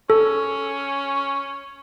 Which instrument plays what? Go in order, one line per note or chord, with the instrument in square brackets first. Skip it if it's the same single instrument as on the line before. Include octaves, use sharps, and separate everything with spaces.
[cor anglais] C#4 [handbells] A4